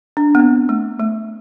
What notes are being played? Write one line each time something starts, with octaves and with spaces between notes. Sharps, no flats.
D4
B3
C4
A3
A3